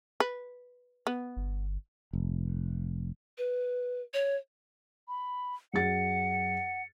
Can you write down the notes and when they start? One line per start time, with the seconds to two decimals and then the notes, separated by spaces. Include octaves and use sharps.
0.20 B4
1.07 B3
1.37 G1
2.13 F1
3.38 B4
4.14 C#5
5.08 B5
5.74 F#2 G#4 F#5 A6 C#7